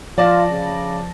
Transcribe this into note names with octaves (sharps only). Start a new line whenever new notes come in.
F3 F4 D5 A5 A#6
C#3